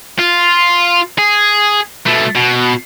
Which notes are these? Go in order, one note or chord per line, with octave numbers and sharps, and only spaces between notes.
F4
G#4
B2 A3
B2